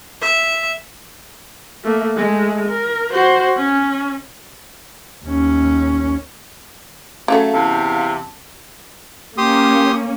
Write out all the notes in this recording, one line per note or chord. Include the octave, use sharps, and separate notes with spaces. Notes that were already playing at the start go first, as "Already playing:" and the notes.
E5
A3 A#3
G#3 A3
A#4
F#4 C5
C#4
D#2 C#4
C#3 F#3 A3 A4 F5 G#6
E2 C3 F5 A5
A#3 C#4 G4 C6 D#6